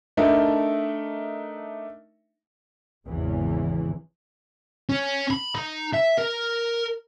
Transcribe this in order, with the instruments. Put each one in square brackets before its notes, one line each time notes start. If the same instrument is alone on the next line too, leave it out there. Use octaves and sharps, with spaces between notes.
[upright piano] A3 D4 D#4 A#4 E5
[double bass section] G#1 E2 G#2 C#3 E3
[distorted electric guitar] C#4
B5
D#4
E5
A#4